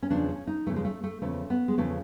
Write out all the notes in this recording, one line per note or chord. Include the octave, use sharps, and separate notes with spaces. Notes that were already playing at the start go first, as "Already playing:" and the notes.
C#4
E2 C#3 F3 D4
C#4
D#4
E2 C#3 F3 A3
G#3
A3
A3
E2 C#3 F3 A3
B3
G#3
E2 C#3 F3 A3